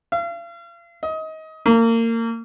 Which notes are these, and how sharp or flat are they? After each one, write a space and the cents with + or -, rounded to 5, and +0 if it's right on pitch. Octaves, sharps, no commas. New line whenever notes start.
F5 -40
D#5 +25
A#3 -30